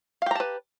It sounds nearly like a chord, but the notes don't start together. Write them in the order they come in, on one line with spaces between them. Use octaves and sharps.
F5 G4 A#5 A5 B4